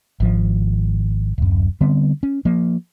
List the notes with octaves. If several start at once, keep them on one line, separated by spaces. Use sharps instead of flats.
G#1 F3
D1 F#2
D3 G3 B3 C4
C#4
F3 A#3